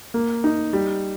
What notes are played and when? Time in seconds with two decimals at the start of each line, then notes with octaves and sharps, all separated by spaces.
0.14 A#3
0.44 D#4
0.73 G3